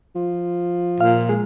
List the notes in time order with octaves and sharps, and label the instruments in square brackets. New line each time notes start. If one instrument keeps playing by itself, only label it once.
[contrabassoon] F3
[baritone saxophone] A#2 [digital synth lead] F5
[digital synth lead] G#3